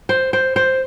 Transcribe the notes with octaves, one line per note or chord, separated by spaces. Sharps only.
C5
C5
C5